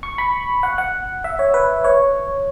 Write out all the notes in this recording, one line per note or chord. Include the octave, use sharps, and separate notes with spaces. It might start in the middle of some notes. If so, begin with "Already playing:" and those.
C#6
B5
F#5
F#5
E5
C#5
B4
C#5